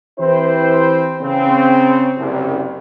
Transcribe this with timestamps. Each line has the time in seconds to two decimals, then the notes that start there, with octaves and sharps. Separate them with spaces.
0.19 E3 C4 E4 G4 B4 C5
1.21 C#3 C4
2.18 F#1 C2